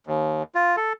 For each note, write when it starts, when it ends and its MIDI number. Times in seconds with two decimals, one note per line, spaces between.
0.07 0.43 39
0.55 0.76 65
0.77 0.93 69